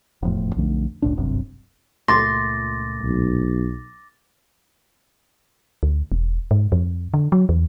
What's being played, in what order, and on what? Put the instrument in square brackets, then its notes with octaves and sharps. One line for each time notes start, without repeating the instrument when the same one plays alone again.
[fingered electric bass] E1 F2 A2
B1 F2 D3 A3
F#1 C#2 A2 D4
D1 G1 F#2 C3
[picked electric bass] C#2 A#2 A3 [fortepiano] C6 [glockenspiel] D6 A6 A#6
[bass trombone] B1
[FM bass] D2
E1
G#2
F2
D3
F#3
E2